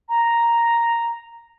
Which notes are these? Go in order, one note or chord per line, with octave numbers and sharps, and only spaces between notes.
A#5